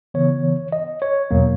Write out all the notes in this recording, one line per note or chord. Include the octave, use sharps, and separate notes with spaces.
C#3 E3 B3 C#5
D#5
C#5
E2 B2 F#3 A#3